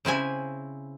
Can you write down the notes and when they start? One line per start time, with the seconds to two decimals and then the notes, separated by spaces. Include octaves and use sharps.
0.05 C#3 C4 E4 G#5